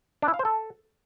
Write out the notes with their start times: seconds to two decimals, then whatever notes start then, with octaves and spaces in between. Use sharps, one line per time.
0.22 D4
0.28 E4
0.34 F5
0.39 C5
0.45 A4